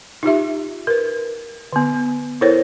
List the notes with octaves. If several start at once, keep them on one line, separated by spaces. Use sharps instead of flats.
D#4 F4 G4 E5
A#4 B4
D3 B3
E4 A4 A#4 C5 C#5